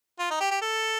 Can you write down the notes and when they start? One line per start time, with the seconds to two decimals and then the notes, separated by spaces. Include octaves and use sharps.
0.19 F4
0.30 D#4
0.40 G4
0.51 G4
0.62 A4